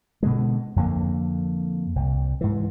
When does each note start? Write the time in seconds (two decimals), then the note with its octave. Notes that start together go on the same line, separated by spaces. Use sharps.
0.23 B2 D3 G#3
0.76 F2 D3 A#3
1.96 C2
2.41 G#2 E3